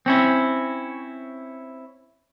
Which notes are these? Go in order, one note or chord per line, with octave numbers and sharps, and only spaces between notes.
C4 C#4 E4